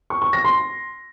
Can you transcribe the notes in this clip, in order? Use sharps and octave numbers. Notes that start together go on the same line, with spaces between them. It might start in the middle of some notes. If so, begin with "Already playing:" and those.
C#6
C#6
A#6
C6